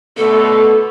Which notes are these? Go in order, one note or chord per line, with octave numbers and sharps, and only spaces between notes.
B2 D3 A3 A4